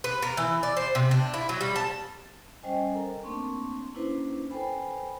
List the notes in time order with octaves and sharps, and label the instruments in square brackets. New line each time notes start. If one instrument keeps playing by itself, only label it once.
[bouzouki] B4
A#4
E3
D5
C5
C3
D4
E4
F#3
G3
A5
[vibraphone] G3 C#4 C5 D#5 G5 G#5
A4 A#4 A#5
A3 A#3 C4 D4 C6 C#6
A#3 C#4 D4 E4 B4 C5
A4 B4 C5 G5 G#5 B5